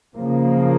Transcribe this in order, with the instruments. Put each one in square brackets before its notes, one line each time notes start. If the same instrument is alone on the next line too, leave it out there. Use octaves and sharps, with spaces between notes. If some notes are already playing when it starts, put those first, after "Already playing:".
[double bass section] C#3 F3 A#3